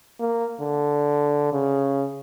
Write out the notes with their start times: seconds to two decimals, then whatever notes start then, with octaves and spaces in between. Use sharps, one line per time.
0.20 A#3
0.60 D3
1.53 C#3